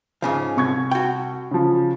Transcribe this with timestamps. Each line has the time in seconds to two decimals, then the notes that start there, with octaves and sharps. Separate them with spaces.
0.22 G#2 C#3 F3
0.56 C2 C#6 G#6
0.91 F#4 G5
1.51 C#3 F3